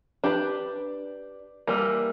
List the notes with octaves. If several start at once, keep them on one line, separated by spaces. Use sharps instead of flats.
D4 G4 B4
E3 G3 A#3